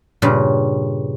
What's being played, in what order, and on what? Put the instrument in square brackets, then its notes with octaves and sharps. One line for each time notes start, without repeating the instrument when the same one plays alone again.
[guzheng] G2 A#2 C#3